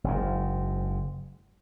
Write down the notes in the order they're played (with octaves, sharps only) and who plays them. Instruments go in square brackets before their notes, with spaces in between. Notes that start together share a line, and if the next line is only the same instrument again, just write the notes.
[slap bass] F#1 G#2